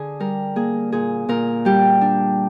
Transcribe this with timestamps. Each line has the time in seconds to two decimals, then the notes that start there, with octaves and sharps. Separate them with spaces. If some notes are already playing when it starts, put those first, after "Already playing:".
Already playing: D3 G#4
0.20 G3 A#4
0.56 A#3 G#4
0.92 A#2 G#4
1.29 A#2 A#4
1.65 G3 G4
2.01 D4